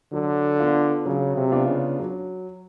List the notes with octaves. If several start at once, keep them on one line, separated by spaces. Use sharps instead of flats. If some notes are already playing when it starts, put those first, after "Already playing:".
D3 F#3
B3 D4 F4
C#3 F#3
C3
B3 D4 F4
C#3
F#3